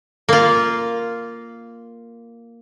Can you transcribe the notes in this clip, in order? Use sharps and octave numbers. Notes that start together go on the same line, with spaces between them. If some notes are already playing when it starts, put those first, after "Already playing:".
A#3 F4